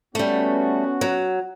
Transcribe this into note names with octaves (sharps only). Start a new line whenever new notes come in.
G3 A3 B3 C#4 F#4
F#3